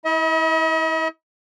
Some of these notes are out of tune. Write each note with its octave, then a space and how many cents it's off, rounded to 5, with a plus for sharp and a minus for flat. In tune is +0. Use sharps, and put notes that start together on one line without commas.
E4 -30 D#5 +45